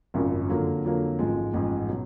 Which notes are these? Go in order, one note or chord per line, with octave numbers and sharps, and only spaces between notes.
G#1 F#2 C#3 F3
F2 D3 F#3 A#3
F2 D3 F#3 A#3
A1 G#2 F3 G#3
A1 G#2 F3 G#3
B2 F#3